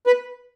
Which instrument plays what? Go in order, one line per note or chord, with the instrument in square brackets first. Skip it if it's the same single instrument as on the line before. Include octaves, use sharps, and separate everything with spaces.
[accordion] B4